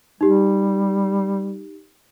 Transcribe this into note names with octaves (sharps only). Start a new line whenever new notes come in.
G3 D#4 G4